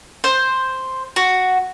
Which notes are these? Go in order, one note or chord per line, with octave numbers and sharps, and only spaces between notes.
C5
F#4